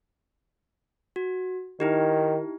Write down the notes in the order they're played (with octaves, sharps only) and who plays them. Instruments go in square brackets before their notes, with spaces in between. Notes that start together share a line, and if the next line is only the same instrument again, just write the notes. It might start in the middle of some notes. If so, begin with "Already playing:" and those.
[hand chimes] F#4
[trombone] D#3 [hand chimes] D#4 E4 G4